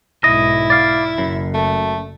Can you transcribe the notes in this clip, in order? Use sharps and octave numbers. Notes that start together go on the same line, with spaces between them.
B1 G#2 E4 D#5
D5 F5
F#1 F#2
A3